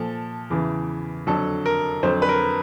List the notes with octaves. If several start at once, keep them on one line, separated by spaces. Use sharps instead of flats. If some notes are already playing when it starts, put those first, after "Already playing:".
Already playing: A#2 F3 A4
E2 C#3 E3
F2 D3 F#3 A4
A#4
F2 D3 F#3 C5
B4
A#4